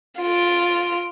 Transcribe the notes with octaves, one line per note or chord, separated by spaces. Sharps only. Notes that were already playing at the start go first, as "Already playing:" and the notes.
F4 D7